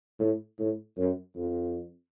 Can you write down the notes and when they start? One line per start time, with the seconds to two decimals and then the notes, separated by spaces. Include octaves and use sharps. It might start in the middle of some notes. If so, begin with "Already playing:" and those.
0.19 A2
0.59 A2
0.97 F#2
1.36 F2